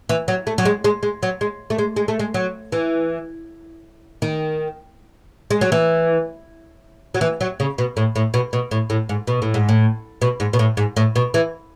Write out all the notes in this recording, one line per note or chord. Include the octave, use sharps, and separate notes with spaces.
E3
F#3
A3
F#3
G#3
G#3
G#3
F#3
G#3
A3
G#3
G#3
A3
G#3
F#3
E3
D#3
G#3
F#3
E3
F#3
E3
F#3
C#3
B2
A2
A2
B2
B2
A2
A2
G#2
B2
A2
G#2
A2
B2
G#2
B2
A2
G#2
A2
B2
E3